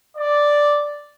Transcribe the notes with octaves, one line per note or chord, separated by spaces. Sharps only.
D5